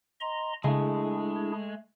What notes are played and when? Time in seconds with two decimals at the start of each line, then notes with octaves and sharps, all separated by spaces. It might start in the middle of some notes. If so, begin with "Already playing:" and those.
0.20 D#5 A#5 C6
0.64 C#3 G#3 A3 D4 E4 G#4